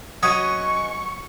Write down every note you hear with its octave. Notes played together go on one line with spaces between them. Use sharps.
F#3 C#4 B4 C#5 D#5 C#6 D#6